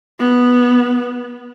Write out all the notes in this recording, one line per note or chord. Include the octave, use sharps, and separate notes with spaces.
B3